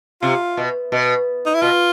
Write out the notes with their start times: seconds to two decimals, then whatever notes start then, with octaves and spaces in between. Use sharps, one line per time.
0.22 C3 F4
0.57 B2
0.92 B2
1.46 D#4
1.55 E4
1.62 B2 F4